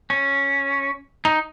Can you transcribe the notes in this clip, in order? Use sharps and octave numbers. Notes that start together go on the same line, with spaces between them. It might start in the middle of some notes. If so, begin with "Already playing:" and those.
C#4
D#4